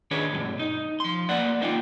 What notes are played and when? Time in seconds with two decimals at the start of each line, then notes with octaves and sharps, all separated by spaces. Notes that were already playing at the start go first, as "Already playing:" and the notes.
0.11 D#3 D4 G#4 B4 C#5
0.33 B1 G2 B2
0.59 D#4
1.00 F3 C6
1.29 A#3 B3 D5 F#5
1.61 A#3 D#4 F4 G5